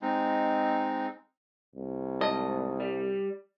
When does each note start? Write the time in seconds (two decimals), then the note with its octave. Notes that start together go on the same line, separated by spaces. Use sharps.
0.02 G#3 C4 D#4
1.75 C2
2.21 G#2 D#5 A5
2.80 G3